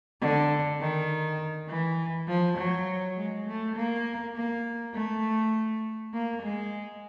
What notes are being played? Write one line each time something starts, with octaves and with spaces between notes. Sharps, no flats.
D3
D#3
E3
F3
F#3
G#3
A3
A#3
A#3
A3
A#3
G#3